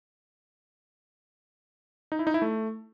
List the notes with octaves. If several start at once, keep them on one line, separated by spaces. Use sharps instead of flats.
D#4
E4
D#4
E4
A3